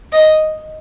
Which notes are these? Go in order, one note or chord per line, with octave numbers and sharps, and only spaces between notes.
D#5